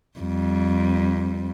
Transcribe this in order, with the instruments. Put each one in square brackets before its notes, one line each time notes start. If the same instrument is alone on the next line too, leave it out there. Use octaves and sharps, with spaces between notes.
[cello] F2 G3